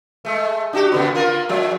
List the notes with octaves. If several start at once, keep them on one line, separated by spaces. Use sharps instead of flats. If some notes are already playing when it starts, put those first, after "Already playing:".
G#3 A3
D4 F#4 G4
A#2 C#3 B3
A#3 F4 A#4
F3 G#3